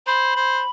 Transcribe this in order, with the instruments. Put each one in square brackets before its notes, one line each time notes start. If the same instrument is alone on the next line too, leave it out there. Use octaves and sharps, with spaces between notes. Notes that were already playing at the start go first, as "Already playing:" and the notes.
[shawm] C5 [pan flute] B5
[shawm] C5